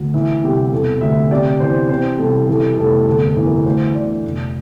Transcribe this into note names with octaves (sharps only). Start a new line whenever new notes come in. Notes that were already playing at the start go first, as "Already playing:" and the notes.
Already playing: D2
E3 E5
C2 G4
E1 A4
D2 E5
C3 D5
E3 C5
C3 C5
C2 A4
E3 A4
F1 A4
G1 A4
A4
E3
A#4
D2 C5
D3 D5
F1